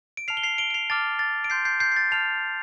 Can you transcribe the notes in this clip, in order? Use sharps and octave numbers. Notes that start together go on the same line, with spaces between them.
D7
A5 F6 C7 F7
G7
C7 F7
D7 G7
D7
C7 F7
A5 D6 F6 A6 D7
A6
D7
C6 G6 C7
G6 C7
G6 C7
C7
A6
A5 F6 C7 F7